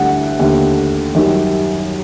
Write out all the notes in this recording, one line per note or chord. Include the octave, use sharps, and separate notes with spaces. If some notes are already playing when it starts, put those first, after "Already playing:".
Already playing: D2 D3 G3 F#5
D#2 D3 A3
F#2 D#3 G3